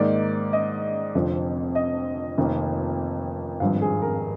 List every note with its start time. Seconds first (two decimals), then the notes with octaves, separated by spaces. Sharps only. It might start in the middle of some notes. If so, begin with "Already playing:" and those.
Already playing: G#2 D#3 A#3 D#4 D5
0.53 D#5
1.14 F1 F2 D3 F3 C4
1.75 D#5
2.38 F1 F2 D#3 A#3
3.60 G#1 G2 F3 F5
3.82 G#4
4.02 A#4